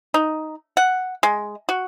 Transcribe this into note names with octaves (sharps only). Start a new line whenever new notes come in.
D#4
F#5
G#3
F#4